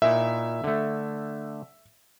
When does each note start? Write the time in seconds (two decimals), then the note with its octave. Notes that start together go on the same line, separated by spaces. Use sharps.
0.02 A#2 D#4 E4 E5
0.64 D3 A3